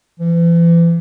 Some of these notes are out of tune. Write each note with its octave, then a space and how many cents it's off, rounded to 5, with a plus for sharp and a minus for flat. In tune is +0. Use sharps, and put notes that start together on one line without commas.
E3 +40